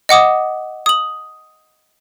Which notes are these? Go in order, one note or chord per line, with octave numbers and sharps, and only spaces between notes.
D#5 F#5 D6 D#6
D#6 F#7